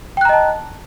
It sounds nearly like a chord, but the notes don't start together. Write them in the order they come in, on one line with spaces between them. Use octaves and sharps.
G5 F#6 A#5 D#5 A5